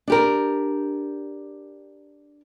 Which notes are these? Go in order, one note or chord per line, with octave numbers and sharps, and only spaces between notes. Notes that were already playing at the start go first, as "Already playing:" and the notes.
D4 G4 A#4